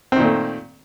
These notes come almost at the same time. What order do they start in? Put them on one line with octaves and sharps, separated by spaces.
C4 D#3 A#2 A3